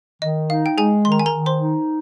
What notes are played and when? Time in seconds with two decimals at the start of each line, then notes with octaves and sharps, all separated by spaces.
0.22 D#3 D#5
0.50 D#4 F5
0.66 G5
0.77 G#3 G#4 G#5
1.05 D#3 C6
1.12 A#5
1.20 G#5
1.26 A#4 A#5
1.32 D#3
1.46 C5 C6
1.60 D#4